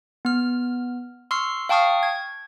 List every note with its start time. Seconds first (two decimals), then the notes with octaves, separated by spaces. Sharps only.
0.25 B3 F6
1.31 C6 C#6 E6 F6 C7
1.69 F5 G5 A5 C#6 D#6 F6
2.03 G#6